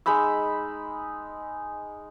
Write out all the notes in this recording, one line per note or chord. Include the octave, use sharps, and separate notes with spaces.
G#3 D#4 B5 E6